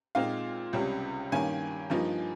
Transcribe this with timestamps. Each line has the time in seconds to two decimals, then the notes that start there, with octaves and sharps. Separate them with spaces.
0.15 A#2 G#3 C4 D#4 F5
0.73 C#2 C3 G3 C#4
1.32 G2 D#3 A#3 C#4 G#5
1.90 G2 F3 A#3 D#4